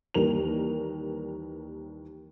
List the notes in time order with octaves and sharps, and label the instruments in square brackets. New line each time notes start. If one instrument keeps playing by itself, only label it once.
[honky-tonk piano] D#2 E3 G3 A#4 F7